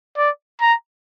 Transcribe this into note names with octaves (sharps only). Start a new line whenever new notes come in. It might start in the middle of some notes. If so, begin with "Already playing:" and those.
D5
A#5